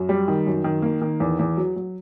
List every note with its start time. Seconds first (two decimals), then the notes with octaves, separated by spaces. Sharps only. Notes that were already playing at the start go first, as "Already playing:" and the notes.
Already playing: F#2
0.09 G3
0.28 D#3
0.46 F#2
0.64 D#3
0.82 A#3
1.01 D#3
1.20 E2
1.39 E2
1.57 F#3
1.76 F#3